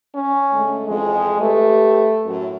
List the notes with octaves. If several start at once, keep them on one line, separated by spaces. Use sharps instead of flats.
C#4
D3 G#3 A3
F2 E3 G#3 G#4
A3 G4 B4
F#2 A2